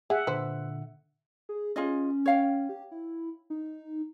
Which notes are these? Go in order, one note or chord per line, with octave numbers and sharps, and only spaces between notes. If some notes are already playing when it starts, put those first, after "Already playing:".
G#4 E5 F#5
A#2 D3 B4 C5
G#4
C#4 F4 G#4 D#5
C#5 F5 G5
G4
E4
D#4